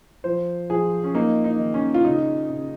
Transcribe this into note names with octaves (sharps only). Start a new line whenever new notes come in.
F3 C5
F3 G#4
C#4
A#3 D#4
D#4
D#3
C#4
F4
C#3 D#4
C#3